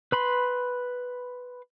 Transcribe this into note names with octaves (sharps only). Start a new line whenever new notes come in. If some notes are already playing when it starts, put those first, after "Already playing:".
B4 B5 C6